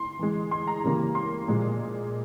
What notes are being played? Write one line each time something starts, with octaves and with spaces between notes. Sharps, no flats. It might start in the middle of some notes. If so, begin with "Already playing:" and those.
Already playing: C6
E3 G#3
C6
A#5
C#3 E3 G3 A#3
C6
A#2 F3 G#3